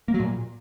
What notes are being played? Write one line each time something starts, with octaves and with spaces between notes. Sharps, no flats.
A#3
F#3
A#2